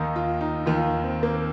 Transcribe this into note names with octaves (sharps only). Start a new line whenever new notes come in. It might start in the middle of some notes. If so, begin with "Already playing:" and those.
Already playing: D#2 D#3 D#4
F4
D#4
D#2 D#3 F4
C4
A#3